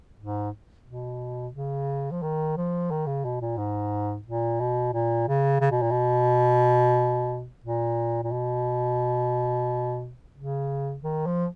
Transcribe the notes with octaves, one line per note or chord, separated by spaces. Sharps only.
G#2
B2
C#3
F3
D#3
F3
D#3
C#3
B2
A#2
G#2
A#2
B2
A#2
C#3
C#3
B2
A#2
B2
A#2
A#2
B2
C#3
D#3
F3